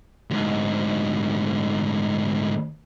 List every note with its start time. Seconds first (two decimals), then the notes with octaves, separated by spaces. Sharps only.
0.31 D2 G#2